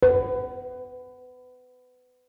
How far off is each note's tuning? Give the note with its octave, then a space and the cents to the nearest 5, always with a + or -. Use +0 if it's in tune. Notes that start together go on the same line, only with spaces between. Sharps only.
B4 +25